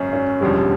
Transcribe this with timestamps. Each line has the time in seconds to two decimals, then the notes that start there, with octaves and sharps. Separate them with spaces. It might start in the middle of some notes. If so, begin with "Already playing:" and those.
Already playing: G#1 F#2 C#3 C#4
0.13 C#4
0.41 E1 D#2 D3 F3 G3